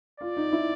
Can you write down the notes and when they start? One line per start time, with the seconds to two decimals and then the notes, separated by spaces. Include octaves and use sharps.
0.21 F4 D5
0.37 D#4
0.53 E4